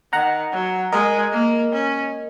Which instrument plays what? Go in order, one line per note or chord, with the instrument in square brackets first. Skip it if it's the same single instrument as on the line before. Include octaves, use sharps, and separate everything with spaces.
[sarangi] D#3 [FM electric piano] F#5 A#5
[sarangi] F#3
[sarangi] G#3 [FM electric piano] A#4 D#5
[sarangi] A#3
C#4